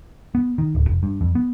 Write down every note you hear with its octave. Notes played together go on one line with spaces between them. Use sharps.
B3
D#3
D1
F1
G2
F2
B3